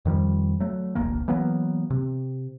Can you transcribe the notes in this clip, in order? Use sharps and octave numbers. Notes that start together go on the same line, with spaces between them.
F2 D#3 F3 G3
F#3 A3
E1 A1 D2 A#3
E3 F#3 A#3 B3
C3